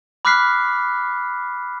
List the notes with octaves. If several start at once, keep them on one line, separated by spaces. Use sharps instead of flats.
B5 D6 F6 F#6 B6 C7